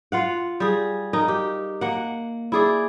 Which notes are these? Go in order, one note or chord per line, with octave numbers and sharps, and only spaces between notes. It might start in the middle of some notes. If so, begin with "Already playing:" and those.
F4 F5 F#5
G3 G#4
D#4 A#4
G4
A#3 F#5
E4 G#4 D5